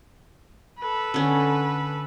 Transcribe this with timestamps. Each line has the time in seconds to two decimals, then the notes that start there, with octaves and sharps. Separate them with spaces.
0.79 A4 B4
1.14 D3 C#4